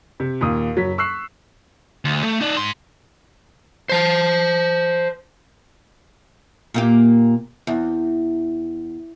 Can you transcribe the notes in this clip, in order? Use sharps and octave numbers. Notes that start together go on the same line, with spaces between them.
C3
D#2 A#2 D#6
F#1 F#3 B6
C#6 E6 F#6 C7
D2
A3
D#4 D5
G#2 C6
C5 A5
A#2 A#3 G4
E2